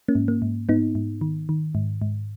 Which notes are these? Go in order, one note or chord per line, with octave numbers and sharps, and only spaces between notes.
A#3 C#4
G#2
A#3
G#2
G#2 B3 D#4
G#2
D#3
D#3
G#2
G#2